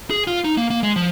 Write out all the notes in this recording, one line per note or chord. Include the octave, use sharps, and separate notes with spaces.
G#4
F4
D#4
A#3
A#3
G#3
F3